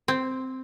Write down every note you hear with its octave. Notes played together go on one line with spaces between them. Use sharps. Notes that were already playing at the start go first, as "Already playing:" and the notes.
C4